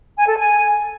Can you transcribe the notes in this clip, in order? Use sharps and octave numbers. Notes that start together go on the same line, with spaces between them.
G#5
A4
G#5